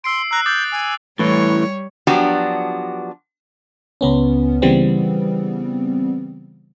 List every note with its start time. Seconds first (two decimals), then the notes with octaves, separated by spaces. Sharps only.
0.04 C6 E6 C7 D7
0.31 A#5 E6 F#6
0.46 D6 D#6 G6 A6
0.72 G#5
1.19 A2 E3 G3 C#5
2.07 F3 F#3 B3 D4 F#4 G4
4.01 C#2 B3 C#4
4.62 C#3 E3 G3 B3 C4